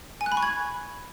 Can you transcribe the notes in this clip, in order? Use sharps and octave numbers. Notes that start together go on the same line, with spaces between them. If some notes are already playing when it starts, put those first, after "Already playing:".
G#5
F#6
B5
C#6
G#6